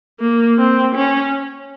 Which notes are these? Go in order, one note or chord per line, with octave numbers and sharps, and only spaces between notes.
A#3
C4
C#4